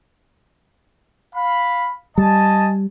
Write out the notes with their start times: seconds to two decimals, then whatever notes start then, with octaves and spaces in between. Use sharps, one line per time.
1.35 F5 B5
2.18 G3 D#5 G#5 A5